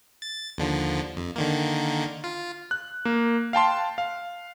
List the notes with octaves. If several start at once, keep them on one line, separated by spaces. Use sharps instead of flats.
A6
D#2 D3 F3
F2
D3 D#3 A#3
F4
F#6
A#3
F5 G5 A5 C6
F5